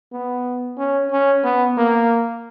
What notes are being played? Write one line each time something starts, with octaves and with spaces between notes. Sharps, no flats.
B3
C#4
C#4
B3
A#3